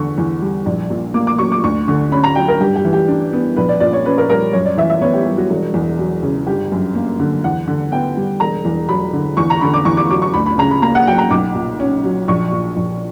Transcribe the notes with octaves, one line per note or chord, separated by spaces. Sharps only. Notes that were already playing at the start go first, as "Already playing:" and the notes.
Already playing: E2 D3 C#6
E2
G3
A#1
A#2
A#3 D6
D6
F#3 C#6
D6
D2 C#6
D3
C#4 B5
A#5
F#3 G5
A#4
G2 G4
G4
E3
G4
D4
B3
A#1 B4
D5
A#2 D5
C#5
C#4 B4
A#4
G3 A#4
F#2 C#5
D5
E3 E5
E5
B3 C#5
G4
G3 G4
F#4
E1
E2
F#3
C#3
G1 G4
F#2
A#3
D3
E2 F#5
D3
B3 G5
G3
E1 A#5
E2
F#3 B5
D3
E2 C#6
A#5
D3 B5
D6
E2 C#6
D6
F#3 D6
C#6
D2 B5
B5
C#3 A#5
B5
A#3 A#5
F#5
F#3 G5
A#5
B1 D6
A#2
C#4
F#3
A#1 C#6
A#2
A#1